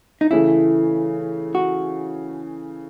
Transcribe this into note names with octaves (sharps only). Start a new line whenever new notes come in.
D#4
C#3 E3 A3 E4
F#4